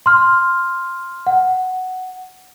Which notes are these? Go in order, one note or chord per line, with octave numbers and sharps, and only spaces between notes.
C6 F6
F#5